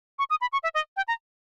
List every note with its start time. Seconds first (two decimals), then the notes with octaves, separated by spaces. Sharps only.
0.19 C#6
0.30 D#6
0.41 B5
0.53 C#6
0.63 E5
0.75 D#5
0.97 G5
1.08 A#5